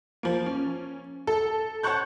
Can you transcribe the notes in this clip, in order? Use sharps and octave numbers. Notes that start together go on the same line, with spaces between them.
F3 A#3
C#4
A4
C#5 F#5 A5 C#6 F#6 G6